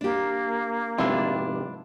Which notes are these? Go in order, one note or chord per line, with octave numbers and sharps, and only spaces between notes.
A#3 D4 G4
F2 G#2 C3 B3 D4 E4 F4